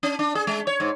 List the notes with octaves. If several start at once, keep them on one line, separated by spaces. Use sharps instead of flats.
C#4
D4
G#4
G#3
C#5
G#2